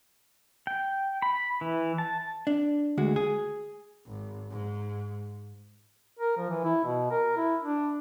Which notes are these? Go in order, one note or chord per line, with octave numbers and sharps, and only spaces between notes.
G5
B5
E3
A5
D4
D2 G#3 F#4
G#4
G#1
G#2
A#4
F3
E3
E4
B2
A#4
E4
D4